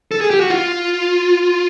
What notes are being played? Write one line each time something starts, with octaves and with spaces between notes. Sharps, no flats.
A4
G#4
G4
F#4
F4